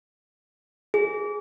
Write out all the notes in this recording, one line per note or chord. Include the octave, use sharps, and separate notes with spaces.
G#4